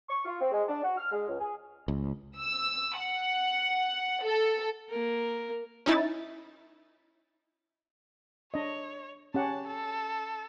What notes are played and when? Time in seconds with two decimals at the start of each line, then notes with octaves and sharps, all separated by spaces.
0.09 C#6
0.25 F4
0.40 C4
0.52 G#3
0.68 D4
0.82 F#4
0.97 F6
1.12 G#3
1.28 C#2
1.40 G#4
1.88 C#2
2.38 E6
2.98 F#5
4.24 A4
4.90 A#3 A#4
5.86 C#4 D#4 E4 A6
8.54 D4 C#5 D#5
9.34 C#4 G4 F#5 A5
9.67 A4